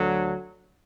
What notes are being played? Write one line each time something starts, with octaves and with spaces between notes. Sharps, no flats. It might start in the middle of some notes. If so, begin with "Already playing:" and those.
Already playing: D2 D3 F#3